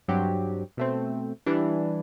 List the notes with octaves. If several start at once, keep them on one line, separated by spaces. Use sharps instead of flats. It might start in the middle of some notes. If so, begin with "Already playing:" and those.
G2 F#3 C4 G4
B2 A3 C4
E3 G3 D4